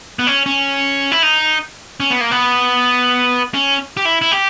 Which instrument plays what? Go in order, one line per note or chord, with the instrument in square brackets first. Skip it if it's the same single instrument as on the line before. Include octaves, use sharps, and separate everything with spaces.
[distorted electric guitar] B3
C#4
C#4
E4
D#4
C#4
B3
A#3
B3
C#4
G4
E4
E4
G4